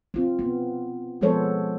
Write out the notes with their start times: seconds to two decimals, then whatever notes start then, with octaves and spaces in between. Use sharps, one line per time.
0.14 C4 F4
0.39 B3
1.21 F3 G#3 B3 A4 C5 C#5